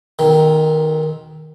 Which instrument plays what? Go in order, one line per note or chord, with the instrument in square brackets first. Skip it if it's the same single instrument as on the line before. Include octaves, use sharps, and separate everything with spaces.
[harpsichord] B1 D#3